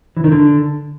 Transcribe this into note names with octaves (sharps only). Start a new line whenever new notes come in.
E3
D#3
D3